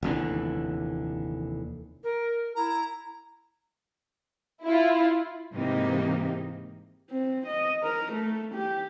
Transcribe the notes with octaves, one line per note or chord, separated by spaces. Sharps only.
F1 D#2 D3 E3
A#4
E4 A#5
E4 F4
G#2 C3 E3 A#3 D#4 G4
C4
D#5
A#4
A3
G4